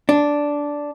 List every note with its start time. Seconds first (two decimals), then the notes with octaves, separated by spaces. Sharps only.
0.09 D4